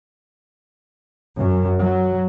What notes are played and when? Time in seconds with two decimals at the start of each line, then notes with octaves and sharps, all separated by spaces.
1.37 F#2
1.80 F#3